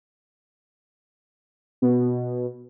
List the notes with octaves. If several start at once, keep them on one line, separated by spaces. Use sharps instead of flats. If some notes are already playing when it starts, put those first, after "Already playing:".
B2